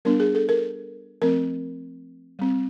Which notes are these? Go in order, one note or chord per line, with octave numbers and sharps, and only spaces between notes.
G3 B3 D4 A#4
G#4
A4
A#4
F3 A3 C4 A#4
G3 C4